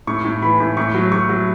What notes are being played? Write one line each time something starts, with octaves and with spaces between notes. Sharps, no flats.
A2 C#6
A2
E3 B5
A2
A2 C#6
F#3
F#3 C#6
F#3